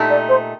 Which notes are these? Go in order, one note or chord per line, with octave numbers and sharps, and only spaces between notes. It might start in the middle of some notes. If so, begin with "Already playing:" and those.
Already playing: A#2 A3 D#4 G4
D5
C5